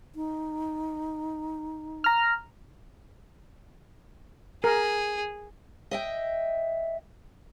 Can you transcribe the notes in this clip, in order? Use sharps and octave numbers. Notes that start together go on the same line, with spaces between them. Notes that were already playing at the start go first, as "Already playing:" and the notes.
D#4
A#5 F6
G#4 A#4
D#5 E5 G5